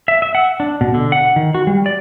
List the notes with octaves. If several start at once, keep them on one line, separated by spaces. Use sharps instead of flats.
E5
E5
F#5
D4
B2
D3
F#5
D#3
F#4
G3
D5